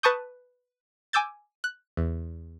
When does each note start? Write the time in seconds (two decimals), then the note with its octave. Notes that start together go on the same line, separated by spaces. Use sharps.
0.03 B4 A5 C#6 D#6 G6
1.13 G#5 D6 E6 G6 A6
1.64 F#6
1.97 E2